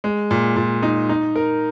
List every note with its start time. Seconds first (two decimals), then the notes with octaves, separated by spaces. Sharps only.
0.04 G#3
0.31 A#2
0.56 A#2
0.83 D#4
1.09 D#4
1.36 A#4